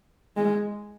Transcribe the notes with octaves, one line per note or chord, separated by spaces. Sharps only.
G#3